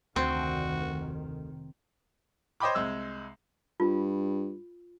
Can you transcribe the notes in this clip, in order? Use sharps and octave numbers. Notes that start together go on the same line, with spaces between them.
F1 D2 D#3 C4 F#4
C5 C#5 D#5 G5 B5 D6
C2 G#3 E6
G2 F4